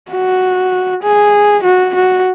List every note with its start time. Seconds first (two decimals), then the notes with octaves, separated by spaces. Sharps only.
0.11 F#4
1.03 G#4
1.64 F#4
1.95 F#4